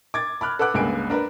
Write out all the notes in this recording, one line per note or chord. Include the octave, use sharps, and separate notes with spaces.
D6 G#6 A6
B5 D6 F6 F#6
A4 B4 F#5 D6 F#6
G1 C#2 G#3 A#3 G#5 D7
D4 A#4 B4